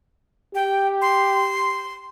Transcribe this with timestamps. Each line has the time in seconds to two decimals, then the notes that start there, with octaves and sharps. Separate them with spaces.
0.55 G4 G5
1.02 C6